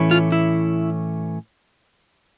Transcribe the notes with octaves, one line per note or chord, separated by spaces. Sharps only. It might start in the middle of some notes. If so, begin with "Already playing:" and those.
Already playing: A2 E3 A3 C#4 E4
F4
E4